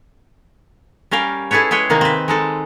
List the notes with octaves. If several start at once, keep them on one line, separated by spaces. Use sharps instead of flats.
G3 C#4 A#4 F5 G5
E4 G#4 A4 B4 C#5
G#3 G#4 B4 C#5 G5
C3 D#3 A#3 D#4
C4 B4
G#3 D#4 A4